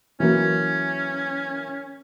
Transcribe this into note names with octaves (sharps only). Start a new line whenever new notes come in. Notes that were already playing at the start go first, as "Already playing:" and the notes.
E3 F#3 A#3 C#4